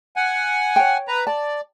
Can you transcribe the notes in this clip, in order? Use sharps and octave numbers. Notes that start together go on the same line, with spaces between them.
F#5 G#5
C#5 G5
B4 A#5
D5 A5